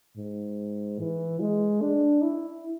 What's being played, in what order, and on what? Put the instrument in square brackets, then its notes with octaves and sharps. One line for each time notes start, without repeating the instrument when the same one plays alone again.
[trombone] G#2
E3
G#3
D4
E4